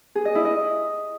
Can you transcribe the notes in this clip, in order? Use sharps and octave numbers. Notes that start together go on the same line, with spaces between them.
G#4
D#5
E4
D#5